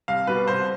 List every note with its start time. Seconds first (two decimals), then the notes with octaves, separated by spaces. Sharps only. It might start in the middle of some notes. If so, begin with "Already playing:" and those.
0.08 C2 F5
0.27 B2 G3 B4
0.47 C2 C5